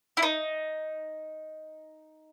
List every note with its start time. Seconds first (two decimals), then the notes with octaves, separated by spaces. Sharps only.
0.17 E4
0.23 D#4